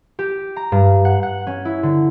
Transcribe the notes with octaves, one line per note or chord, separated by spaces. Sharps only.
G4
A#5
G2
F#5
F#5
C#4
E4
D3